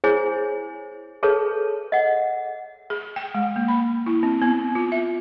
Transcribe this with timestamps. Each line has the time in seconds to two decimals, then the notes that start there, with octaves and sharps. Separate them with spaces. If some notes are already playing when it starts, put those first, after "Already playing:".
0.04 E4 G#4 C5 C#5 G#5
1.23 G#4 A4 B4 C#5 A5
1.92 D#5 F#5
2.90 G#4
3.16 G5
3.34 G#3
3.56 A#3
3.68 B5
4.06 E4
4.23 C4
4.42 B3
4.75 F4
4.92 E5